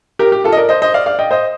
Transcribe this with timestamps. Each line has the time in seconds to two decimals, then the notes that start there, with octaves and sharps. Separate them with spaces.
0.19 G4 A#4
0.32 G4
0.44 F4 A4
0.52 D#5
0.57 A#4 D5
0.69 C5 D#5
0.82 C5 D#5
0.94 D5 F5
1.06 D5 F5
1.19 D#5 G5
1.31 C5 D#5